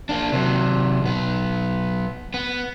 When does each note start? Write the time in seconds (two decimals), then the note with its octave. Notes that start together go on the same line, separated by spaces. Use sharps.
0.09 A#3 D4
0.32 C3 F#3
1.01 B1 B3
2.34 B3